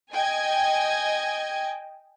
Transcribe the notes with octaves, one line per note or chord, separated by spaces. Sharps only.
D#5 G5 G#5 G#6